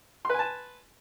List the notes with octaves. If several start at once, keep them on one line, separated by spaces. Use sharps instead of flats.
B4 G#5 A5 C6